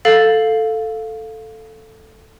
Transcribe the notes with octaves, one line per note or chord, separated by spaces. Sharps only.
A4 F5 A6